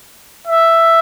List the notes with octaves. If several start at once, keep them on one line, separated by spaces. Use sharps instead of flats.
E5